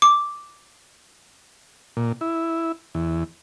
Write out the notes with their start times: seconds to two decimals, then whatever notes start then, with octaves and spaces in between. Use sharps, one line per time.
0.02 D6
1.97 A#2
2.21 E4
2.95 E2